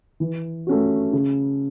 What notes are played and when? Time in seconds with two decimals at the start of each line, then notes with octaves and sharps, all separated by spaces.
0.20 E3
0.67 A3 C#4 F#4
1.13 C#3